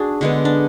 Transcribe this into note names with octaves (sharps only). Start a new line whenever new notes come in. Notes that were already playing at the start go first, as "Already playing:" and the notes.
Already playing: D4 F#4 G#4
D3 G#3 B3
D4